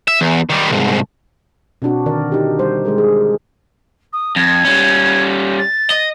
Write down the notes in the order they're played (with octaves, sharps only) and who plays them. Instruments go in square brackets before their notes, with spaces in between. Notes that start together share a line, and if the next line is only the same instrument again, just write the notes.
[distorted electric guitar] E5
E2
D#3 G3
C2 G#2
[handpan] B2 C4 D4 F#4
D3 D#3 A#4 D5
D#4 G4
G3 C5
G#3 G#4 A#4
G#4
[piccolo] D#6
[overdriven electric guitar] F2 [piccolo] G#6
[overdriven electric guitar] G3 C#4
[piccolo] A6
[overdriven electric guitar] D#5